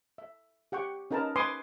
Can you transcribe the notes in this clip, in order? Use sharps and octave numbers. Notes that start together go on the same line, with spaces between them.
E5
G4 F#5 G5 C#6
C#4 D#4 A#4 B4 A5 A#5
B4 G#5 C6 D6 D#6